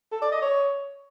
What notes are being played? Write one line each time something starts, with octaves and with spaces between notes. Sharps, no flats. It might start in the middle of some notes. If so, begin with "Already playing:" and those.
A4
D5
D#5
C#5